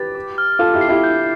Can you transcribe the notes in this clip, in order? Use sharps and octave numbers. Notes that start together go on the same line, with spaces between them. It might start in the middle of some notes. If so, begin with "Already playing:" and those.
Already playing: G4 B4 A6
D6
F6
F4 A4 D6
E4 G4
C7
E4 G4
G6